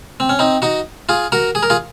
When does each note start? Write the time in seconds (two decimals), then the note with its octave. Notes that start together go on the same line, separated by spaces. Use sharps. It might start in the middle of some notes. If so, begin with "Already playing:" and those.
0.20 C4
0.29 C#4
0.39 C4 D#4
0.62 D#4 F#4
1.09 F4 G#4
1.32 F#4 A#4
1.55 G#4
1.63 A#4
1.70 F4 G#4